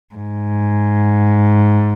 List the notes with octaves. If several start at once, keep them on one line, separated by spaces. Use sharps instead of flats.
G#2